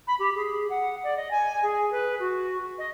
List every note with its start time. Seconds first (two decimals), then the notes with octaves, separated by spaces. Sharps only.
0.07 B5
0.19 G4
0.35 G#4
0.70 F#5
1.03 D5
1.17 D#5
1.31 G#5
1.63 G#4
1.92 B4
2.19 F#4
2.78 D#5